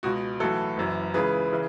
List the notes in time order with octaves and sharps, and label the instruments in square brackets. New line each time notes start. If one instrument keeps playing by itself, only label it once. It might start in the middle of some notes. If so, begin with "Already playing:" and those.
[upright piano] C#2 B2 F#4
B1 A2 E3 F#4 A4
F#1 F#2 E3
C#2 C#3 E3 G#4 B4
C#3 E3